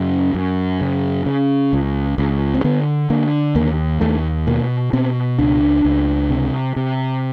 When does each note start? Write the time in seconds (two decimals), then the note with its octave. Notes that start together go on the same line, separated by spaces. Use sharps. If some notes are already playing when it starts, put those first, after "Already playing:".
Already playing: F#2 C#3
0.34 F#2
0.81 C#3
1.26 C#3
1.73 C#2
2.18 C#2
2.54 C4
2.64 D3 B3
3.10 D3 A#3
3.55 D#2 A#3
4.01 D#2 A3
4.47 B2 A#3
4.93 B2 C4
5.38 C#2 D4
5.85 C#2
6.30 C3
6.76 C3